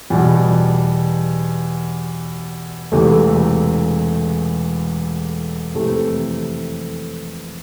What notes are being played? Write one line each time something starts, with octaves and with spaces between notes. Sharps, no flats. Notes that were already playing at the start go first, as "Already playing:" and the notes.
E2 B2 G3
E1 E2 C3 E3 A3
F2 C3 E3 A3 C4